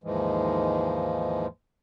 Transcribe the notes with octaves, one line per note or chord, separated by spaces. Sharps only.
D#2 G#2 E3 F3 G#3